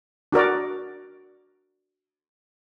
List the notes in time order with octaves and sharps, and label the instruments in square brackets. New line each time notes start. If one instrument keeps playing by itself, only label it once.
[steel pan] D4 F#4 A#4 D5